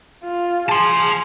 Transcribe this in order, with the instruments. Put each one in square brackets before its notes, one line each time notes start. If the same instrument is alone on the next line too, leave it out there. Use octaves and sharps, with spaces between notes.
[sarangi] F4
[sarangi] G#4 [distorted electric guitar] A5 C6